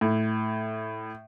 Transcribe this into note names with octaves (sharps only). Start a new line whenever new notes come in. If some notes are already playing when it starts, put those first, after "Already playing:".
A2